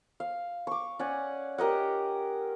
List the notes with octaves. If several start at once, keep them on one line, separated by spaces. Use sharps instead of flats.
F5
C#6 D6
C#4 D5 F#5 G#5
G4 A#4 D#5 F#5